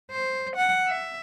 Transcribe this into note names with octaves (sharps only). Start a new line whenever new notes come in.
C5
F#5
E5